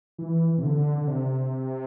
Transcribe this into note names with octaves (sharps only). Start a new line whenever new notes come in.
E3
C3
D3
D3
C3